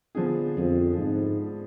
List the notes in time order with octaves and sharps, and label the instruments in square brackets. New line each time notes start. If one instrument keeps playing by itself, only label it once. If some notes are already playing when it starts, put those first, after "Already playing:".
[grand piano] D3 F3 B3 D4 G#4
[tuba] F2
G#2